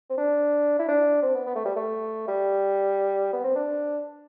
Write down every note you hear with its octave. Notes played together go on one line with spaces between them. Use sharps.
C4
D4
E4
D4
C4
B3
B3
A3
G3
A3
G3
B3
C4
D4